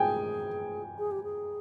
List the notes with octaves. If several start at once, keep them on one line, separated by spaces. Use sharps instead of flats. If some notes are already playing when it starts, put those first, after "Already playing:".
Already playing: G#4 G5 G#5
G#4
G4
G#4